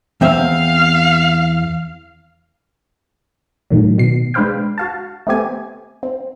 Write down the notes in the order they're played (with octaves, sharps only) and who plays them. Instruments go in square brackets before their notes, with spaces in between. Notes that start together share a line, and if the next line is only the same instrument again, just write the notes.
[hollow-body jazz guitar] E2 C4 E5 [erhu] F5
[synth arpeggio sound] A2 D#3 F#3
B2 C7
G#3 D4 B4 C5 F5 G5
F#4 F5 A5
A3 B3 C4 G4 G#5
C4